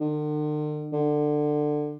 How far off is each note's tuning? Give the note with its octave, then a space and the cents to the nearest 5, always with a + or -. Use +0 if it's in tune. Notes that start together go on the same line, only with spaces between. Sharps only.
D3 +45
D3 +20